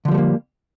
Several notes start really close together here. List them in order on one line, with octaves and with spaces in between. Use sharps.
D3 F3 G3 A3 A#3